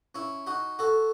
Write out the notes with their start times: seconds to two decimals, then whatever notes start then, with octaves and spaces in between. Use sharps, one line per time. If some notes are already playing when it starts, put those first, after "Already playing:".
0.15 C#4 E4
0.47 D#4 F#4
0.79 F#4 A4